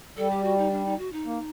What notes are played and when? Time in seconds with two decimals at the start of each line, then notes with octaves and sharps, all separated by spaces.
0.17 G3 A4
0.31 G4
0.44 F#4
0.58 D#4
0.71 D4
0.86 D#4
0.99 F#4
1.13 D#4
1.26 A#3